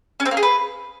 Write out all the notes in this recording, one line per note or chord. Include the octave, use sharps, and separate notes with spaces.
C#4
C4
A#3
G#4
B4